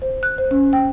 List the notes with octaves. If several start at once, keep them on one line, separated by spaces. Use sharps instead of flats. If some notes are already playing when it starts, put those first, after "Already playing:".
C5
F#6
C5
C#4
G5